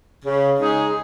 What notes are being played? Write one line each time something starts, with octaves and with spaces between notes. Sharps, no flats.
C#3
G#3 D#4 G#4